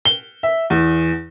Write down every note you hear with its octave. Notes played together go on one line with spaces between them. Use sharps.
G7
E5
E2